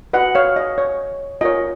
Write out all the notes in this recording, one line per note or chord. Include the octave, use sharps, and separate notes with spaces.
F#4 B4 D#5 F#5
C#5 F5
D#5
C#5
F4 A#4 C#5 D#5